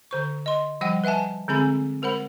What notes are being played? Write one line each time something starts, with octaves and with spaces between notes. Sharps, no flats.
D3 C5 C#6
D#5 C6
F3 G3 D#5 F#5 G5
B4 E5 F#5 G#5 A5
D3 G#3 C4 G#4 G#5 B5
G#3 A#4 C5 F#5 B5